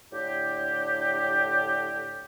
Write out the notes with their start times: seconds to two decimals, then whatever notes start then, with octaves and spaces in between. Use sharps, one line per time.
0.13 A2 D3 G4